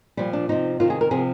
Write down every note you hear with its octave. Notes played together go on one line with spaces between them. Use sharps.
A#2 F3 G3
D4
C3 F3 D#4
C3 D#3 F4
G#4
A#4
C3 F3 G#4